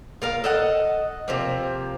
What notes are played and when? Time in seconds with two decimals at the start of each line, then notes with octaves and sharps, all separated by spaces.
0.22 F4 A#4 F5
0.44 A4 D#5 F#5
1.28 C3 F3 A#3